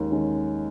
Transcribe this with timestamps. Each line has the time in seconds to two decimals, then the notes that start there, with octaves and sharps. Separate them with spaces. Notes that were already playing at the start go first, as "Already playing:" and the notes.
Already playing: D#2 D#3 G#3 C#4
0.12 D#3 G#3 C#4